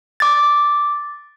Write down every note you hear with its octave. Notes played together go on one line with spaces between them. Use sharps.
D6 A6